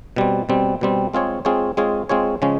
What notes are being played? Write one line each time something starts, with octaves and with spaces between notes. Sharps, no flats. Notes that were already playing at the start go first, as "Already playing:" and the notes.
B2 G3 C4
B2 G3 C4
B2 G3 C4
G#3 C4 F4 G#4 C#5
G#3 C4 F4 G#4 C#5
G#3 C4 F4 G#4 C#5
G#3 C4 F4 G#4 C#5
C#3 F3 G#3 C#4